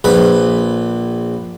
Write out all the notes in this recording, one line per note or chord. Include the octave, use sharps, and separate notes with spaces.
A#1 B4